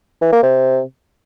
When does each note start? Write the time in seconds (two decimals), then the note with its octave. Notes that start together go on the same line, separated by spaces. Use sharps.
0.22 E3
0.32 A#3
0.43 C3